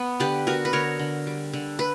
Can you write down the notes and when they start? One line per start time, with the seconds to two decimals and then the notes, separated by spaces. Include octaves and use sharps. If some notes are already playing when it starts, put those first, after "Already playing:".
Already playing: B3
0.20 D3 G4 B4
0.47 B3 F#4 A#4
0.65 B4
0.73 D3 A#4 C#5
0.99 D3
1.27 G3
1.53 D3
1.79 B4